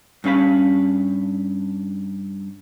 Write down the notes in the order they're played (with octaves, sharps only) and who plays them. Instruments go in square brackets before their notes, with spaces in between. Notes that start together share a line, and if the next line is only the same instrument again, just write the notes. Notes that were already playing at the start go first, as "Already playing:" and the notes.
[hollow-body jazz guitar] G2 C#4 F5 B5